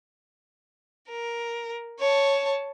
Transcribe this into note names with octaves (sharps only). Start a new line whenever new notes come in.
A#4
C#5 A5